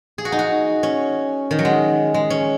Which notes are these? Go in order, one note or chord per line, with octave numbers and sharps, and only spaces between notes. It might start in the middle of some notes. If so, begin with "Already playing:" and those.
G#4
F#4
D#4
F#4
C#4
D#3
F#3
G#3
G#3
C#4